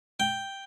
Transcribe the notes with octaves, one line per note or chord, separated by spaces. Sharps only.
G5